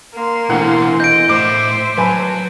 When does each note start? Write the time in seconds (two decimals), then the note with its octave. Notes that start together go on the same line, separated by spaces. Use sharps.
0.14 A#3 C6
0.49 D2 B2 E3 G#4 F#5
1.00 D#5 G6 D7
1.29 A2 C5 E5 D6
1.97 F#3 B4 G#5 A5